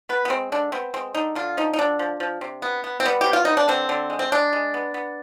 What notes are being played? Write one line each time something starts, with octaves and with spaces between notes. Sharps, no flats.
B3 B4
B3
G#3 C4
D3 D4
B3 C4
G#3 C4
D3 D#4
D3 F4
F3 D#4
D#4
D3 D4
F3
F3
C3
B3
B3
C4
G3 B3
C3 G4
F4
B3 D#4
D4
D3 C4
D3
G#3
C4
G#3 D4
G#3
B3
B3